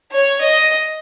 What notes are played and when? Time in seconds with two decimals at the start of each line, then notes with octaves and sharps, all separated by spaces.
0.12 C#5
0.42 D#5